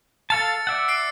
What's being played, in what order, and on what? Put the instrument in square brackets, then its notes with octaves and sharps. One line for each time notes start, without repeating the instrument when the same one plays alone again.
[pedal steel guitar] A4 F5 A5 [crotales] A6 C#7
[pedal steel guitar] D5 E5 F#5
[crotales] E6 C7 D7